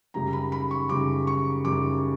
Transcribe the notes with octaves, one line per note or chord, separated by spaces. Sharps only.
F#2 C#3 G3 A#5
B5
B5
C#6
F#2 C#3 G3 D6
C#6
F#2 C#3 G3 D6